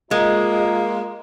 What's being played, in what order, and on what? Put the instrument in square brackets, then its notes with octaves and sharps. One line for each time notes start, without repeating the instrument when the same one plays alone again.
[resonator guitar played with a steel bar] G#3 [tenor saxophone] A#3 [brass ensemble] F4 D#5 A#5